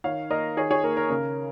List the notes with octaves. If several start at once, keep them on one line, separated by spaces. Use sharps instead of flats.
D#3 C#5 F5
A#3 A#4 D#5
D#3 G#4 C#5
G#4 C#5
A#3 A#4
A#4
C#3 A#4